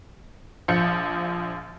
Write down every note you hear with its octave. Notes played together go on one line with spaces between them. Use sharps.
A#1 F3 G6 C#7